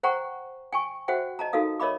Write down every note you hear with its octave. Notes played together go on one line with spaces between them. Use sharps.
C5 F#5 G5 A#5 C#6
G5 G#5 C#6
F#4 C5 E5 F#5 G5
D#5 A5 A#5
D#4 F#4 A4 A#4 F5 D#6
A#4 C#5 D#5 E5 B5 D6